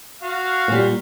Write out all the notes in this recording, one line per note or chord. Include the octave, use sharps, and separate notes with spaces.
F#4 F5
A#2 G3